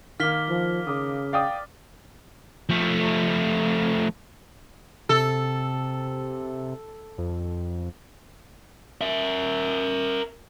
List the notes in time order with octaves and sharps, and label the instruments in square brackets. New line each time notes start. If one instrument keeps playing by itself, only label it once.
[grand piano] D#3 [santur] A#3 F5 [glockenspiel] F6 B6 G7
[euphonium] F3
[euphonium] C#3 [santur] D6 D#6
[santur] D5 [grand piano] F5 G5 D#6
[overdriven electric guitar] F3 A3
[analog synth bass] C3 [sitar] A4
[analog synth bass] F2
[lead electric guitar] A#4 E5